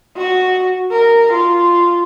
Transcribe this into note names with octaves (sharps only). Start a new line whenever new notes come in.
F#4
A#4
F4